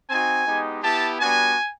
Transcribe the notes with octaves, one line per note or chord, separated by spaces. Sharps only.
C4 D#4 F#4 G#5
G#3 B3 D#4 G4
B3 E4 G4 A5
G3 B3 D4 F#4 G#5